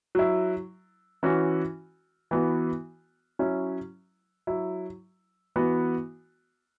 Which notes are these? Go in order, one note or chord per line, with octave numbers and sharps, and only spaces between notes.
F#3 E4
E3 C#4 F#4
E3 B3 F#4
F#3 C#4 E4
F#3 E4
E3 B3 F#4